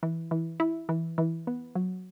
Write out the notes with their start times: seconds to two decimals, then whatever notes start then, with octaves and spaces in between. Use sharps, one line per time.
0.03 E3
0.31 E3
0.60 E4
0.89 E3
1.18 E3
1.47 B3
1.75 F#3